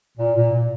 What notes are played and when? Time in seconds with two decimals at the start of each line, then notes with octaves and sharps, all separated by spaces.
0.18 A#2
0.36 A#2
0.53 A#2